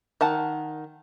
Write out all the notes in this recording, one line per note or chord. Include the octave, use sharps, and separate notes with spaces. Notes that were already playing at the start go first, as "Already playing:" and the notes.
D#3 F#5 A5